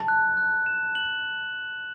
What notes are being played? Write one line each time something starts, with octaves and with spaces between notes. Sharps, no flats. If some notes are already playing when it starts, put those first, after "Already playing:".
Already playing: A5
F#6
F#6
E7
F#7